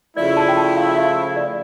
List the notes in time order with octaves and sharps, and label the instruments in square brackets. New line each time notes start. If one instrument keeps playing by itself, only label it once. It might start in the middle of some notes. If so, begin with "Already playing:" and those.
[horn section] C#3 F3 A3 E4 [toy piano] D5
[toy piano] A5
G5
A5
F5
E5
D5